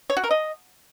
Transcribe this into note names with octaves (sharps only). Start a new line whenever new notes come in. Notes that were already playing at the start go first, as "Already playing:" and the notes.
C#5
F#4
A#4
D#5